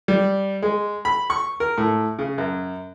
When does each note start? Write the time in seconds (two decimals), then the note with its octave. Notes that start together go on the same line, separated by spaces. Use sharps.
0.08 G3
0.62 G#3
1.05 B5
1.30 C#6
1.60 A#4
1.78 A2
2.19 C#3
2.38 F#2